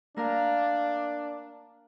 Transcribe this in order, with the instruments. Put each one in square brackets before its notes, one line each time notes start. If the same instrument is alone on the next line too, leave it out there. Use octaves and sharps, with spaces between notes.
[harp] A#3 A#4 F5 [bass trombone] D4